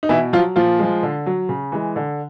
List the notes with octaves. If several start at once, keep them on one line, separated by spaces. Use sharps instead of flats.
D#4
B2 E3 E4
F3 F#3 F4
A#2 F3 F4
F3 G#3
D3
F#3
C#3
E3 G#3
D3